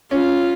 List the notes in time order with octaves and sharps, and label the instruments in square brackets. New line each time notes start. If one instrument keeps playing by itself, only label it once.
[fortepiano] C#4 [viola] F4